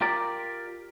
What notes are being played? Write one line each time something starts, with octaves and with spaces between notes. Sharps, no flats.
F4 G4 A#4 D5